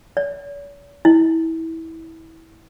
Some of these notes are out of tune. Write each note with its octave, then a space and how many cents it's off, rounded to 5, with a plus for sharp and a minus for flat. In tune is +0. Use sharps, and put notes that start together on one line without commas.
C#5 +45
E4 -20